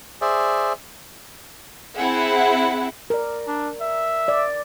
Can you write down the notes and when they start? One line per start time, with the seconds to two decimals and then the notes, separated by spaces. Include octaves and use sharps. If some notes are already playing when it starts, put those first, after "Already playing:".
0.21 G#4 C5 D5 E5
1.96 C4 E4 G#4 E5 F#5
3.10 A#4 D5
3.48 D4
3.81 E5
4.28 D5